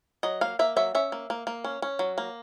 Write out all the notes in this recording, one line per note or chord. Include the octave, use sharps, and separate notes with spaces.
F#3 D#5
A#3 F5
A#3 E5
F#3 E5
C#4 E5
A#3
A#3
A#3
C#4
C#4
F#3
A#3